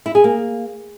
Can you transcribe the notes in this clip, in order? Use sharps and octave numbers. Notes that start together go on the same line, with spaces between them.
E4
G#4
A#3